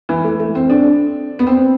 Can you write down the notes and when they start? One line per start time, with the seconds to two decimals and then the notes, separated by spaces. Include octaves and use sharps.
0.09 E3
0.24 A3
0.39 A3
0.55 C4
0.70 D4
1.39 B3
1.47 C4